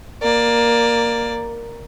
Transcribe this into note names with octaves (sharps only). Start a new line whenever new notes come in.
A#3 D5